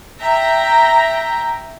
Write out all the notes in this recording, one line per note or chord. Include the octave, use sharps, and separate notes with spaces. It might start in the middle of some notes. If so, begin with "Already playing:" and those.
E5 G5 A#5